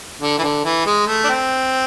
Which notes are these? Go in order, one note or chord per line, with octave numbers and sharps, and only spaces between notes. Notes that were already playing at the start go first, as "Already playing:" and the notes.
D3
E3
D3
E3
G#3
A3
D4
C4